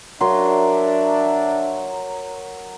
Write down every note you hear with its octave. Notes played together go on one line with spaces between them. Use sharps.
F#3 D4 A#4 E5 C6